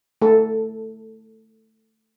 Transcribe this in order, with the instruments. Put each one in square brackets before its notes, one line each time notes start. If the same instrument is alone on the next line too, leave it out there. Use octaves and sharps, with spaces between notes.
[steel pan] A3 A4